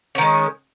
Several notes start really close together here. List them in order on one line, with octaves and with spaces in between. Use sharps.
C#4 D#3 G#3